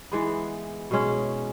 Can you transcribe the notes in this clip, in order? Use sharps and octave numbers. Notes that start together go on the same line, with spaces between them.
E3 G#3 B3
B2 G#3 C#4